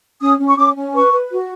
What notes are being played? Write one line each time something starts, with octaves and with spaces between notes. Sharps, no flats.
C#4 D#6
C#4
C#6
C#4 D6
C#4
B4 C#6
B4
F#4